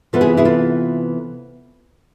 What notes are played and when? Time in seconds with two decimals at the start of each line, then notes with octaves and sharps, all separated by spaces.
0.13 C3 E3 B3 F4 A4
0.21 E4 G#4
0.37 E4 G#4
0.45 F4 A4